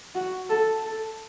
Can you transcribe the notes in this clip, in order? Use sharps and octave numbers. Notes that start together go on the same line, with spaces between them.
F#4
A4
A4